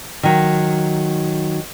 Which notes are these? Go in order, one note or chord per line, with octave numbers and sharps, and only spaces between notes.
D#3 F#3